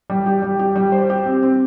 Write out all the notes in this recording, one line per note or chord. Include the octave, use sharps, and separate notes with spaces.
G3
G4
G3
G4
G3
C5
G4
C4
C4